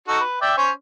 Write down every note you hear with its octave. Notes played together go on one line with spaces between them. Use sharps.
D#4 F#4 A4
B4
D5 E5 G5
C#4 C5 C#5